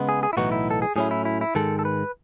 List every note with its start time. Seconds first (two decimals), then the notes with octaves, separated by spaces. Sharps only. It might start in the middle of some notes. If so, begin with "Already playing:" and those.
Already playing: C#3 G#3 B3
0.09 G#4
0.23 G#4
0.33 E4
0.37 B1 A2 E3 B3 D#4 F#4
0.52 E4
0.71 A4
0.82 G#4
0.96 A2 F#3 C#4 E4 G#4
1.11 E4
1.25 E4
1.41 E4
1.55 G#2 D#3 G#3 A4
1.79 A4
1.85 B4